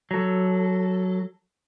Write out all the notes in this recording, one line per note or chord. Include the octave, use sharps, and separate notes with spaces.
F#3 A4